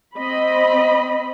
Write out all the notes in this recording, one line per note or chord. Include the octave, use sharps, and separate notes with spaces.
C4 D#5 B5